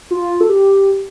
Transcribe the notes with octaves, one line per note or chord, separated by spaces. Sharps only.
F4
A4
G4